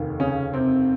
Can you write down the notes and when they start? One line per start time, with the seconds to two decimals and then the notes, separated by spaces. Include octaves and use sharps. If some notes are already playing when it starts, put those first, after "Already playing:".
Already playing: F1 D#2 D#3
0.20 C#3 C#4
0.54 C3 C4